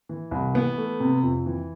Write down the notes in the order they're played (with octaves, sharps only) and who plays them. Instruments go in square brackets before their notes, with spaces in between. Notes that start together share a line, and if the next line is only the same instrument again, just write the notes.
[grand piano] E3
C2
E3 B3
A3
C3
F2
E3